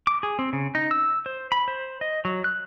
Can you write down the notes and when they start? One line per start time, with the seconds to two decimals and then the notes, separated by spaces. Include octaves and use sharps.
0.07 D6
0.23 G#4
0.39 C4
0.53 C#3
0.75 D#4
0.91 E6
1.26 C5
1.52 B5
1.68 C5
2.01 D#5
2.25 F#3
2.44 F#6